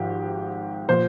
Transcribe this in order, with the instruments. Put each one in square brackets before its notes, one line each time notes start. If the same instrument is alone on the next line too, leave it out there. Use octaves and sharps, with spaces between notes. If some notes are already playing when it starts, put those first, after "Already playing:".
Already playing: [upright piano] G#1 G#2 F3 G4
A#2 F3 C5